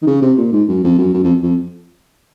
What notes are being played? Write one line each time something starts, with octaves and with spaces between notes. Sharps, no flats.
D#3
C#3
C3
A#2
G#2
F#2
F2
F#2
F#2
F2
F2